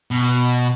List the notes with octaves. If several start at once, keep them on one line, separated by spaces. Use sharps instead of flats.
B2